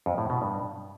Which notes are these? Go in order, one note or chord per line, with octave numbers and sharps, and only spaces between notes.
F2
A2
B2
G2